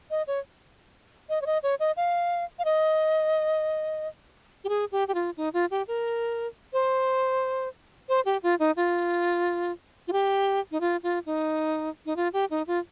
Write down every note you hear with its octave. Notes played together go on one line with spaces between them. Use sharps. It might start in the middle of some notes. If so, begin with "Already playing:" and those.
D#5
C#5
D#5
C#5
D#5
C#5
D#5
F5
F5
D#5
G4
G#4
G4
G4
F4
D#4
F4
G4
A#4
C5
C5
G4
F4
D#4
F4
F4
G4
D#4
F4
F4
D#4
D#4
F4
G4
D#4
F4